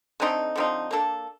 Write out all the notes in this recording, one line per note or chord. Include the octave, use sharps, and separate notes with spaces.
D3 A3 C4 D#4
D3 F3 C4 D#4
A#3 D4 A4